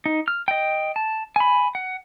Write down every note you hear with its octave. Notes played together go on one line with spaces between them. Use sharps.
D#4
F6
D#5 G5
A5
G#5 B5
F#5